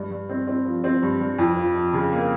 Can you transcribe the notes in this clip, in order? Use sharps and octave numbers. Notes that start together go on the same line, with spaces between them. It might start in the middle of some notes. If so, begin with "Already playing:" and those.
Already playing: G2
G2
C4
C4
F3
C4
G2
G2
F2
F3
F3
C#3
A#3